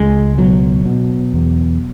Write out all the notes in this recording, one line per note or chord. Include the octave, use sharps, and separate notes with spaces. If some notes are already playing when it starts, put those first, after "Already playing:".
Already playing: C#2 G#3
B2 F#3
B2
E2